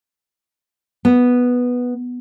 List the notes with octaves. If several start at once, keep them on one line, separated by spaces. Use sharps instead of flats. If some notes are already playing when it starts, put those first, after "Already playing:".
B3